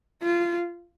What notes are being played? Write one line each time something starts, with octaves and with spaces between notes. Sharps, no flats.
F4